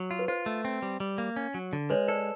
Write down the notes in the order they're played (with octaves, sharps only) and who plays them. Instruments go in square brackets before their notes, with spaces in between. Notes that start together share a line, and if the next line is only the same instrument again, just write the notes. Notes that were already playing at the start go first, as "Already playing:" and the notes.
Already playing: [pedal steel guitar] F#3
F4
[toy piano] B4
[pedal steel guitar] F4 [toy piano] C5
[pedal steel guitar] A3
C4
G3
G3
A#3
C#4
F#3
D3
[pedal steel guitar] G#3 [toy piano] B4 C#5
[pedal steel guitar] A4 [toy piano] C5 D5